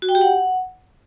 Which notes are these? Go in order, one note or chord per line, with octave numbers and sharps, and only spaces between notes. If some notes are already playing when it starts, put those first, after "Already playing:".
F#4
G5
G4
F#5